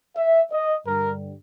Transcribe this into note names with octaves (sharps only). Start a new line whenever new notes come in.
E5
D#5
G2 D3 G3 A#4